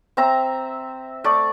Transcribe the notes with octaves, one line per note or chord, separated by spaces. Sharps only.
C4 E5 A#5
A3 D5